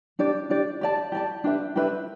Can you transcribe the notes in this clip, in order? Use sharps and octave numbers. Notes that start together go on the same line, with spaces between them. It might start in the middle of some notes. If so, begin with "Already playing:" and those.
D4 G4 D5
D4 G4 D5
G4 D5 A5
G4 D5 A5
D4 G4 B4 E5
D4 G4 B4 E5